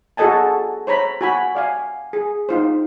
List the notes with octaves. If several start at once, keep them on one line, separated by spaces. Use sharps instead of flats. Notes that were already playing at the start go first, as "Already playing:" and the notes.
F#4 G#4 A4 D#5 G#5 A5
C5 C#5 A#5 B5
F#4 G#5 B5
D5 F5 G#5
G#4
D#4 F4 C5